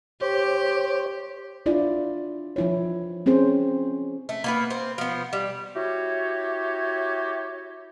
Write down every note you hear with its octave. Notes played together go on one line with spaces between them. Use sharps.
G4 C5 C#5
D4 E4 F4 D5
F3 E4 C#5
C4 C#4 G#4 C5
A3
A#3 B3 B4
C4
F3 B3
G3
E4 F#4 G4 C#5